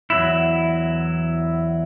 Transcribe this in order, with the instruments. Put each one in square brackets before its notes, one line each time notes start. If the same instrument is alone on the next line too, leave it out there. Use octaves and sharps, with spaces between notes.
[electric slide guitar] E2 F#3 E4